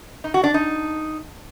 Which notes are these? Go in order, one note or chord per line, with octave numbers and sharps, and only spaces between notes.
D#4
F#4
D4
D#4